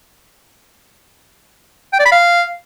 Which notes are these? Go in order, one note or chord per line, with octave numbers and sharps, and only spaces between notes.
G5
D5
B5
F5